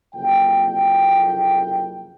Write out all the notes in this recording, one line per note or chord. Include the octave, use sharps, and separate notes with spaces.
F#1 F2 C3 A#3 G5